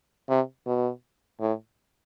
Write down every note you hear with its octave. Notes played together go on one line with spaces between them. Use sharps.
C3
B2
A2